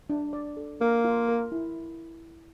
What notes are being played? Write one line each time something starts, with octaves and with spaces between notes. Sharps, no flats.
D4
D5
A4
A#3 A#4
F4
A#4
E4